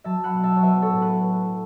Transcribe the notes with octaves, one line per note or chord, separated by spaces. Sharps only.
F#3 E5 A5
F#5 B5
B2
E5 A5
C#5
F#3 B4 E5
A4 C#5
A2
B4